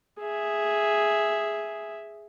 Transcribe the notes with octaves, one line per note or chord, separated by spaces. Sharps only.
G#4 E5